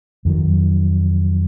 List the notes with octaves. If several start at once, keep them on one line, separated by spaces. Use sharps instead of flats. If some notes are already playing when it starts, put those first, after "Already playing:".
F2 D#3 F#3